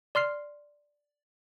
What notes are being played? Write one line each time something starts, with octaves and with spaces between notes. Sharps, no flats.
D5 C6 F6 C7